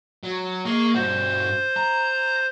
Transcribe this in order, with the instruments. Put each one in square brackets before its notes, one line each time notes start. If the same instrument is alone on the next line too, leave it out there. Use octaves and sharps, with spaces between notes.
[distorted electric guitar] F#3
[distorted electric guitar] A#3 [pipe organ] G#4 D#5 C#6
[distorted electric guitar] G2 F#4 [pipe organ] C5
[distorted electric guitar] A#5